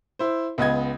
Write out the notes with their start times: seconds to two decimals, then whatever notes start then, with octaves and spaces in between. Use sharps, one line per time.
0.19 E4 C5
0.58 C#2 B3 D#5 G#6